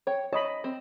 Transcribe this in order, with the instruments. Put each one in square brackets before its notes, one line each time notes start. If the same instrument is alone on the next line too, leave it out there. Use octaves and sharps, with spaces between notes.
[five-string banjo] C#5 G5
[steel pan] C#5 D#5 B5 [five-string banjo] A5
[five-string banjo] C4